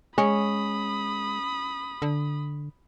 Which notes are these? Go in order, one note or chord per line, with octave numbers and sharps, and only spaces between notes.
G#3 C#4 B5 D#6
D3